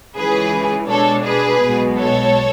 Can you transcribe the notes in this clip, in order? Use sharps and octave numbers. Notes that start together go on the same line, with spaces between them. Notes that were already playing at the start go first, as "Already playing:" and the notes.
C#2 C#3 E3 G#4 B4
B2 G#3 D4 A4 C#5
G#4 B4
B1 B2 G#3 B3
A4 C#5